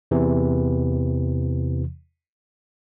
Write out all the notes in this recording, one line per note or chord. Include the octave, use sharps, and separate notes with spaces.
E2 C3 E3